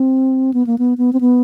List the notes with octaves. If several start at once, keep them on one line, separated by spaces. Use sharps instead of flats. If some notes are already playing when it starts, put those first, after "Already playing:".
Already playing: C4
B3
A#3
B3
B3
C4
B3